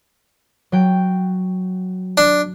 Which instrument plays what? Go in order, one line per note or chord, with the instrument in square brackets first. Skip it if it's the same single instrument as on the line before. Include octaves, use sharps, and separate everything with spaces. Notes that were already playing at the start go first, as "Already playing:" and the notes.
[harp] F#3 G5
[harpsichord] D4